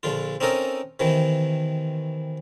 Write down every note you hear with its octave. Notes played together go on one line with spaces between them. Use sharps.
A#1 D3 F4
C4 C#4 D#4 A4 A#4
C3 D#3 E3